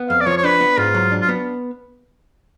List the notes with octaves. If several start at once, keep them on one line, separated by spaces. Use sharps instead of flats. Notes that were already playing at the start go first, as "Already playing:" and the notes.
Already playing: B3
F2 F5
D5
F3 C#5
C#5
D4 B4
B3
G#2 F4
F#3
D4
F4
B3